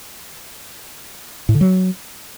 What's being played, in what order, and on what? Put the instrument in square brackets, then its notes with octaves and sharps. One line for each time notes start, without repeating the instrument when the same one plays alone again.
[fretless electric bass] A2
D3
F#3